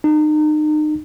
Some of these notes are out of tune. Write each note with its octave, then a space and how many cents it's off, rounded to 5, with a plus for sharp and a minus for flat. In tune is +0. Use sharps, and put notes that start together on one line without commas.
D#4 -35